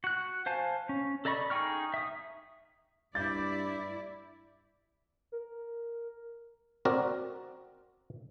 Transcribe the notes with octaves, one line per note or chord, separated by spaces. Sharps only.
F#4 F#6
C5 F5 G#5 A5
C#4
A4 D5 D#5 B5 C#6
D#4 G#4 G5 C#6 F6
E5 D#6
G2 E4 D5 G6 A6
A#4
C4 F#4 A#4 D5